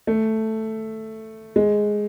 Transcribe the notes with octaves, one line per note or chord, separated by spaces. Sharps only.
A3
G#3